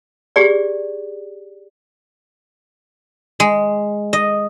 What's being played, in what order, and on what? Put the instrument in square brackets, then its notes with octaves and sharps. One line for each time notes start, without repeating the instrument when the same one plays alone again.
[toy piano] G4 G#4 D5
[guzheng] G#3
D#5